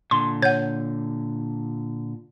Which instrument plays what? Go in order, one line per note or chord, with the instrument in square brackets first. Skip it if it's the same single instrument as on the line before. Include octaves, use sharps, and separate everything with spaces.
[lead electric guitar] A#2 D3 [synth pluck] C6
[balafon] C#5 F#5 [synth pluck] G6